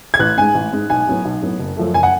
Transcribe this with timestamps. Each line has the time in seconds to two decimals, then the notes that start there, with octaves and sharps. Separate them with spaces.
0.14 G#6
0.19 A1 F#6
0.37 G#2 G#3 G#5
0.55 A1
0.73 G#2 G#3
0.90 B1 G#5
1.07 A2 F#3 B3
1.25 B1
1.42 A2 F#3 B3
1.59 F#1
1.77 F#2 F3 A3
1.94 F#1 G#5
2.03 F#5